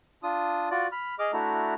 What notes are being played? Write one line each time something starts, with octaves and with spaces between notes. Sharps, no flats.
D4 F4 D#6
F4 F#4 D5
B5 F6
G#4 D#5 D6 F6
A3 D4 E4 F#4 A#5